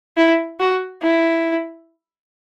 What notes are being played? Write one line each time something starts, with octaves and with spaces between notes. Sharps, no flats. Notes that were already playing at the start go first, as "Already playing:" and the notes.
E4
F#4
E4